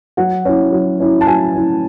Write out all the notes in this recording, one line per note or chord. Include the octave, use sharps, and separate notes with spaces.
F#3 F#5
C#4 E4
F#3
C#4 E4
A5
F#3 G#5
C#4 E4